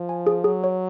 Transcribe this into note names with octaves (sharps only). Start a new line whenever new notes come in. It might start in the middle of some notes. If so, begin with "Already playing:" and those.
Already playing: F3
G#5
G#4
F#3 G#4
C#5